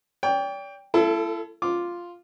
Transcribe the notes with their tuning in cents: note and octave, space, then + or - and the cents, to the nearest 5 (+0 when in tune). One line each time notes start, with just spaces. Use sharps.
D5 -45 G5 +15
A3 +35 E4 +40 A4 -5
F4 +0 D6 +0